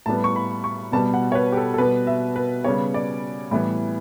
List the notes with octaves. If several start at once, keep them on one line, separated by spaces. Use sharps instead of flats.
A2 G3 B3 A5
C#6
B5
C#6
B2 G3 B3 A5
F#5
C#5
B4
G4
A4
A4
B2 G3 B3 B4
E5
B4
C#3 G3 B3 C#5
D5
A2 E3 G3 B3